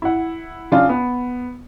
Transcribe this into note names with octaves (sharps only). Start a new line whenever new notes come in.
E4 F#5
C#3 D4 F4
B3